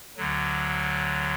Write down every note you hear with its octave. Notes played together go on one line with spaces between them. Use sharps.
D2 D3 F#3